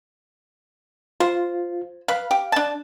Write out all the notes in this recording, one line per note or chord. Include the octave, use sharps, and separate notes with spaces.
F4 C5
B4 F5
G4
D4 A5